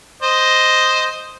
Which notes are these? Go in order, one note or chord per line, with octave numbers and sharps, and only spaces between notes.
C5 D#5